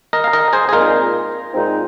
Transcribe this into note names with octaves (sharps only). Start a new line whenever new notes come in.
A#4 D#5
F5
A#4 D#5
G#4 C5
G#4
A#2 G#3 C4 D#4 F4 A#4
A#2 G#3 C4 D#4